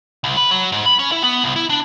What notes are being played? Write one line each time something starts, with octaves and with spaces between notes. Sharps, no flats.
C2
B4
F#3
G#2
B5
C#4
E4
B3
C2
E4
D4